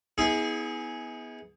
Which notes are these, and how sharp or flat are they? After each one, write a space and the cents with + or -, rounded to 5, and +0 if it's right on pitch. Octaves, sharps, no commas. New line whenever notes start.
B3 -5 E4 -45 G#4 +0